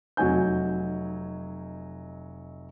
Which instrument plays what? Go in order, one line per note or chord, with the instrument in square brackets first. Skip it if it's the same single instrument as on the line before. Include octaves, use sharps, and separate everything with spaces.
[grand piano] F1 F#3 D#4 G#5 G6